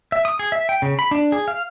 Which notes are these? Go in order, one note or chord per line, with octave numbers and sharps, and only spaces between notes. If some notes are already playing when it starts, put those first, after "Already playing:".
E5
D#6
G#4
E5
G5
C#3
B5
D4
G#4
F5